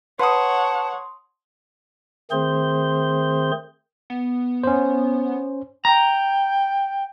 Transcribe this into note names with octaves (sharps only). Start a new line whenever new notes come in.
B4 C#5 F#5 A5 C6 D#6
D#3 A3 C4 G#4 C5 C6
B3
C#4 C5
G5 A#5